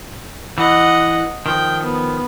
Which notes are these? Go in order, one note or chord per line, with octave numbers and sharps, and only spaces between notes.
E3 D#5 F#5
D#3 F3 G5
B3